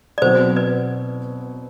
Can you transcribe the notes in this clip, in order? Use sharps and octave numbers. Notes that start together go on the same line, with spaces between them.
D5
B2 F#3 C4 C5
B4 D5